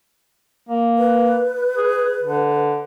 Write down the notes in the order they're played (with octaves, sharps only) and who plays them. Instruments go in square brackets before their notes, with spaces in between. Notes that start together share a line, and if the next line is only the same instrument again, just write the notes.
[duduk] A#3
[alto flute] B4
[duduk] G#4
D3